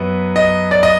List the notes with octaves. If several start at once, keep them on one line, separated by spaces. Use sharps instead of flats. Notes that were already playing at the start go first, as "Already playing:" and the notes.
Already playing: F#2 B3
D#5
D5
D#5